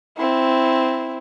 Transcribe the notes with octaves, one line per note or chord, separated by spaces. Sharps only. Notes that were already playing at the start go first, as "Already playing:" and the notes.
C4 E4